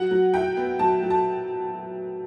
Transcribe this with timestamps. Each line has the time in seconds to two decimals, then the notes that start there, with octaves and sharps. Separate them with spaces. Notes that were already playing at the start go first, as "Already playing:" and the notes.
Already playing: F#3 F#5
0.11 F#3
0.34 E4 G5
0.57 B3
0.79 F#3 A5
1.03 F#3
1.10 A5